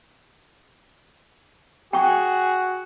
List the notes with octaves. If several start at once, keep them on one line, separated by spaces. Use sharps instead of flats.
F#4 G#4 G5 C#6